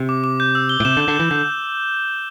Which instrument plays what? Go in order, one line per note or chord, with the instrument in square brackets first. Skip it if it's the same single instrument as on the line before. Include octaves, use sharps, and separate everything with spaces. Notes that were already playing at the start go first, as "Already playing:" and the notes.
Already playing: [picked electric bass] C3
[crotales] D6
D6
G6
E6
G7
[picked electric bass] A2
[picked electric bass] C3 [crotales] E7
[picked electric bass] D3
[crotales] G6
[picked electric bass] D3
[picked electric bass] E3 [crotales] G6
[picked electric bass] D3 [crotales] G6